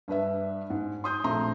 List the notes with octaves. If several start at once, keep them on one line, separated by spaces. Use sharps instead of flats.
G2 D4 B4 E5
G#2
C6 D#6 G6
A#1 A3 C4 E5 A#5 C6